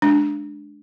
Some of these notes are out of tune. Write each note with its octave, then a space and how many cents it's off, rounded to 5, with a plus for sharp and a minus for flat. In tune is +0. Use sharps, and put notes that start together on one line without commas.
G#3 +25 D4 +0